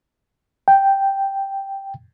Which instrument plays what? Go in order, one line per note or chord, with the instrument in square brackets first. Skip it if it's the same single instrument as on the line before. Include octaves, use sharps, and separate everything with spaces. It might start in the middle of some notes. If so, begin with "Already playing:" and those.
[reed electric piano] G5